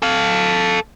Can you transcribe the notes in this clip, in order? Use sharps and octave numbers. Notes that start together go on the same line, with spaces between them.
A4 F5